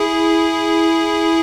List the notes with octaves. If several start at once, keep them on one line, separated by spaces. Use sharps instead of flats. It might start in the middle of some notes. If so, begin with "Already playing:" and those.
Already playing: E4 G#4